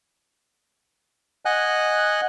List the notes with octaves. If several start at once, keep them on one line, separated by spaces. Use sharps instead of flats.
D#5 F#5 G#5 F#6